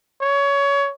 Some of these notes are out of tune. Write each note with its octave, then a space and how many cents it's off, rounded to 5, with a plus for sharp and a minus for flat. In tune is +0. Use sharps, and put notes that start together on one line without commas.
C#5 +20